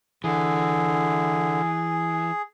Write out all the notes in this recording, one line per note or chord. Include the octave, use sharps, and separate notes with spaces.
D3 E3 G#4